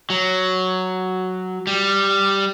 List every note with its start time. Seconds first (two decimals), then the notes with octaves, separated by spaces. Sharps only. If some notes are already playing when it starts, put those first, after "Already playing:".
0.10 F#3
1.67 G3